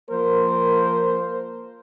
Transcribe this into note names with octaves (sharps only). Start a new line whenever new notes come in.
F3 A#3 A#4 C5